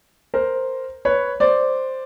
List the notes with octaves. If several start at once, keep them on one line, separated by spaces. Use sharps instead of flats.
A#4 C5
B4 C#5
C5 D5